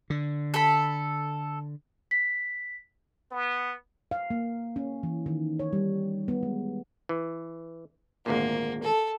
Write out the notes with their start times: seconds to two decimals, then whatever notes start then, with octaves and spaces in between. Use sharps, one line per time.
0.10 D3
0.54 A4 B5
2.11 B6
3.31 B3
4.11 F5
4.30 A#3
4.76 C#4
5.03 E3
5.26 D#3
5.59 C#5
5.73 G3
6.28 B3
6.43 G#3
7.09 E3
8.26 G#1 D2 A#2 A#3
8.83 A4